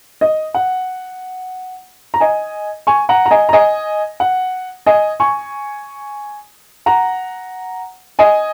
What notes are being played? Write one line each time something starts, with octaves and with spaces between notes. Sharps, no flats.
D#5
F#5
A#5
D#5 G#5
G#5 C#6
F#5 A#5
A#5
D#5 G#5
A#5
D#5 G#5
F#5
D#5 G#5
G#5 C#6
F#5 A#5
D#5 G#5